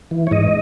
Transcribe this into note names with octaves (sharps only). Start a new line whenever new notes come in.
E3
C#5
G#2 D#5